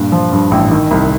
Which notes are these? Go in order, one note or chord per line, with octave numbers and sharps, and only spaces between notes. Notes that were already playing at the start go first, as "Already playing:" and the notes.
Already playing: G2 A#2
F3
G2
A1
D#3
C2